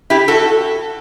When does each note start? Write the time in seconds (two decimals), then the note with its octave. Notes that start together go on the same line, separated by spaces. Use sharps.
0.10 E4 G4
0.28 F#4 A4